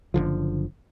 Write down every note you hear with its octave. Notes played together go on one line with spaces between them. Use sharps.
F#1 D2 D3 F3